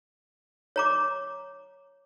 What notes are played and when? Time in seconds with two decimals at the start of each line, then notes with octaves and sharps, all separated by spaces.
0.76 C#5 A#5 D6